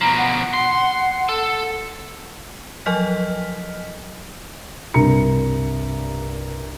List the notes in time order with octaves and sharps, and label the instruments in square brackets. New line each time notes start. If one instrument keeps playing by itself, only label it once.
[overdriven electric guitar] B2 F3 [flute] A#5
[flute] F#5
[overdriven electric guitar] C6
A4
[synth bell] F3 F#3 D#5 F6 B6
[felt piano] C2 G2 A#4 A#5 C#7